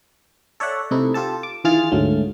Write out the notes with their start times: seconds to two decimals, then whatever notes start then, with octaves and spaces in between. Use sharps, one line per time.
0.60 A4 C#5 D5 E5 F#5
0.91 C3 A3 D#4 E4
1.14 F4 G4 A4 A5
1.43 D6
1.64 D#3 E3 F4 G#4 F6 A6
1.92 D2 G#2 F#3 A3